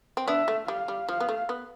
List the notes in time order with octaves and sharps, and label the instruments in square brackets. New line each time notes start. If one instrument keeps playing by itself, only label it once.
[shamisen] C4
[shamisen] B3 D4 [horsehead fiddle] E5
[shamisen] A3
[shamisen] G3 [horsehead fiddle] F5
[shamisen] G3
[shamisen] F3 [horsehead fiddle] F5
[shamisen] B3
A3
B3